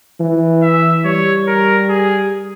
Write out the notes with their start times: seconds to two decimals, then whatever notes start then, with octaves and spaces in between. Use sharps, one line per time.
0.20 E3
0.62 E5
1.05 G3 C#5
1.48 A#4
1.90 G#4